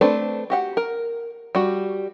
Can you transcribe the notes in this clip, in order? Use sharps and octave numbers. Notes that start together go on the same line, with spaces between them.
A3 C4 D4 B4
F#4 G4 F#5
A#4
G3 F#4